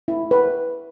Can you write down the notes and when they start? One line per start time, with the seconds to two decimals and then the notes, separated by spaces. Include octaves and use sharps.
0.08 E4
0.31 B4